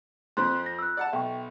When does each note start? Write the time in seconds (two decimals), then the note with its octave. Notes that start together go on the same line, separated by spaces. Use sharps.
0.37 F2 F3 C4 C6 F#6
0.66 A#6
0.79 E6 F#6
0.97 D5 F#5 A5
1.13 B1 E5 G5 C#6